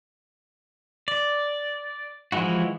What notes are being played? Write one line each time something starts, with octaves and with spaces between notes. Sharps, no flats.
D5
E3 F3 G#3 E4 F#4